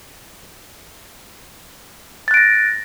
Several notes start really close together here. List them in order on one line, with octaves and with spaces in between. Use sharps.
A6 F#6 D7 A#6